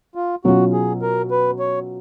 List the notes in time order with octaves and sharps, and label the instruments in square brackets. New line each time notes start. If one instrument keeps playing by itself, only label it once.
[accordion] F4
[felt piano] B2 F#3 C#4 F4 [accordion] F#4
[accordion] G#4
A#4
B4
C#5